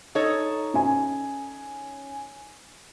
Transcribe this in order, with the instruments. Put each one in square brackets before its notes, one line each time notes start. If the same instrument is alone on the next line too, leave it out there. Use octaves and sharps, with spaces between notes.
[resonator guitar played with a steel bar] D#4 A4 C#5
[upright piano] C#4 G#5